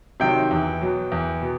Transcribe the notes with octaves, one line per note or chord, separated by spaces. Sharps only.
C3 D#3 F#3 G5
E2
B2 F#3
E2
B2